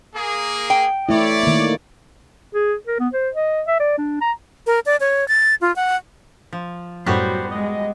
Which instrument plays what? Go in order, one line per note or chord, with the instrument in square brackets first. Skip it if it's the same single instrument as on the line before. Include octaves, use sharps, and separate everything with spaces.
[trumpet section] A#3 G#4
[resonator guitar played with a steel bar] G5
[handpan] A3 E4 [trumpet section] C#5 D5
[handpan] D#3 A#3
[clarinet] G#4
A#4
B3
C5
D#5
E5
D5
D4
A#5
[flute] A#4
D5
C#5
A6
F4
F#5
[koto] F3
[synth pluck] F#2 A2 [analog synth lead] F#3 [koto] G3 B3 F#4 [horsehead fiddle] C5
[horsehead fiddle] G#3 [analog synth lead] D#5